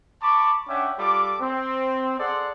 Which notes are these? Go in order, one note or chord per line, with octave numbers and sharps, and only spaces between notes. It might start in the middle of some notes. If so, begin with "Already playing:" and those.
A5 B5 C#6 D6
C#4 D4 E5 F#5 G5 D6
G3 F4 A4 D6
C4
G#4 A4 D5 F#5 C6